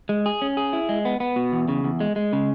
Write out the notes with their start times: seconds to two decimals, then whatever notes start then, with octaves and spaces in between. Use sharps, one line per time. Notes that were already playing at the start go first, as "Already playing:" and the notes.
0.09 G#3
0.26 G#4
0.42 C#4
0.57 G#4
0.73 E4
0.89 G#3
1.05 B3
1.20 B3
1.36 B2
1.53 E2
1.68 C#3
1.84 E2
2.00 G#3
2.16 G#3
2.33 C#3